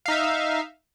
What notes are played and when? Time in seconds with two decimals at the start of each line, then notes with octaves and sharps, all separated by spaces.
0.06 F5
0.08 D#4
0.11 E5